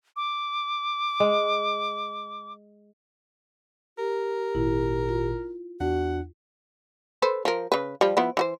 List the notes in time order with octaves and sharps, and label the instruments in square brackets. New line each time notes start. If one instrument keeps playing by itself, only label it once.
[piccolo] D6
[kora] G#3
[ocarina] G4 [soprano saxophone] A#4
[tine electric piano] G#1 A#2 [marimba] E4
[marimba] F4
[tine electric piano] E2 D4 [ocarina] F#4 [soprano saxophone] F#5
[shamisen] A4 B4 C5
F3 A#4
C#3 B4
F3 G3
F3 B3 E4
E3 F#4 C5